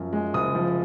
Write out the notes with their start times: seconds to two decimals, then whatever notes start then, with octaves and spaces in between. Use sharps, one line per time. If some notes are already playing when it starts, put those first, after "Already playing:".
Already playing: F#2 F3
0.13 G#3
0.34 F#1 D#6
0.55 F3